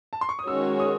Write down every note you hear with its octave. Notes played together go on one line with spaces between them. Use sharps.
A5
C6
C#6
D#6
D#3 G#3 C#4 F#4 C#5 E6
D#6